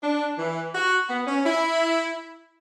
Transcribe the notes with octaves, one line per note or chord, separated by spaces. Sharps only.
D4
E3
F#4
B3
C#4
E4